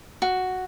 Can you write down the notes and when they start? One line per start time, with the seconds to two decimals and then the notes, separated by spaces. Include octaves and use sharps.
0.22 F#4